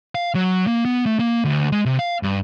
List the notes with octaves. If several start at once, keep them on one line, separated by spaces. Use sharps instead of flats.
F5
F#3
A#3
B3
A3
A#3
D2
G#3
C3
F5
G2